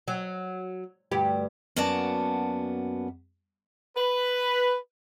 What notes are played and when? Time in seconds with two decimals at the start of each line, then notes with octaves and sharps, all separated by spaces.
0.08 F#3
1.12 D2 G2 G4
1.76 F#2 A#3 B3 F#4 D5 A5
3.97 B4